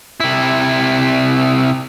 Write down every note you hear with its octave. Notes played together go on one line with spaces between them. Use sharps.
C3 E4